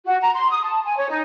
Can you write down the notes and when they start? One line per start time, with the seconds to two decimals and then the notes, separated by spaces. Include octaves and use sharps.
0.07 F#4
0.21 A#5
0.34 C6
0.50 D#6
0.64 A5
0.84 G#5
0.98 C#5
1.09 D#4